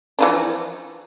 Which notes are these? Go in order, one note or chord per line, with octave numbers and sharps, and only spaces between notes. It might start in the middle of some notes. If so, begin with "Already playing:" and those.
E3 F3 D4